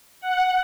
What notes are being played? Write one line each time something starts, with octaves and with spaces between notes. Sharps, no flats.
F#5